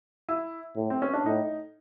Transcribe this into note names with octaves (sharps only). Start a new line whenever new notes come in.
E4
A2
C4
C#4
D4
A2 D#4